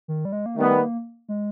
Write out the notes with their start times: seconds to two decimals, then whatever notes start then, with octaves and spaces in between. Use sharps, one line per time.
0.08 D#3
0.25 G3
0.32 G#3
0.46 A#3
0.56 D#3 G3 A3 B3
0.81 A#3
1.29 G#3